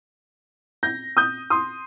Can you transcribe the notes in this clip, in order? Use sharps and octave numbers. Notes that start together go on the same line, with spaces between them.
G6 A#6
D#6 G6
C6 D#6